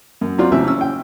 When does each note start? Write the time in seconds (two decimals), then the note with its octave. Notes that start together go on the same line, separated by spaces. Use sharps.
0.21 F#2
0.38 F#3 C4 F4 D5
0.52 A1 C#3 E3 C4 E5
0.67 C#4 E6
0.81 G5